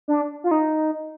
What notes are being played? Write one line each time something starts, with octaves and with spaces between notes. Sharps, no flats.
D4
F4
D#4